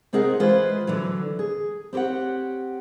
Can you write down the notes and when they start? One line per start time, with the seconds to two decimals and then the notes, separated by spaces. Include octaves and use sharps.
0.13 C3 C4 D#4 G#4 A#4 F#5
0.40 E3 G#3 F4 G#4 B4 C5
0.87 D3 E3 F#3
1.39 G#4
1.93 C4 G4 B4 C#5 F#5